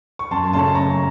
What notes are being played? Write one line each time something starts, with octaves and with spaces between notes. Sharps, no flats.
C#6
F#2 A5 C6
C#3 A3 C#4 A5 C6
F#2 A#5 C#6